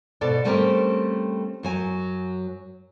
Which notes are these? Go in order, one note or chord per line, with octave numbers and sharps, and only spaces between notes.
G#2 B2 A4 D5
G3 A3 C4 C#4 G4 A#4
F#2 F#3 G#5